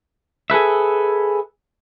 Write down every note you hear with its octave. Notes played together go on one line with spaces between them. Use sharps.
G#4 A4 B4 E5